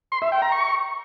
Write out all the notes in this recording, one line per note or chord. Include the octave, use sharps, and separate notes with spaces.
C6
E5
G5
A#5
C#6